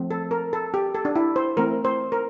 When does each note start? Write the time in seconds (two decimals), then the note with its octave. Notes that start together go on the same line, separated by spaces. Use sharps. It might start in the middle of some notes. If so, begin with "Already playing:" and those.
Already playing: F3 A3 C4
0.11 A4
0.31 A#4
0.53 A4
0.74 G4
0.95 A4
1.05 D4
1.16 E4
1.36 C5
1.57 E3 A3 C4 A#4
1.85 C5
2.12 A#4